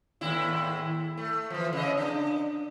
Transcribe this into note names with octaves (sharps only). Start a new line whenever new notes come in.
D#2 A2 E4
A3
E3 F3
C#3 D#5
D4